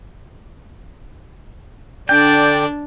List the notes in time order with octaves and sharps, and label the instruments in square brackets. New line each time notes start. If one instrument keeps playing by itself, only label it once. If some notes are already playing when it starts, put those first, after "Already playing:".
[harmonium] D3 D5 [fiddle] D4 [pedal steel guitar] G5